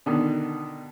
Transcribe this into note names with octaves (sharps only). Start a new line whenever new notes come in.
B2 D3 D#3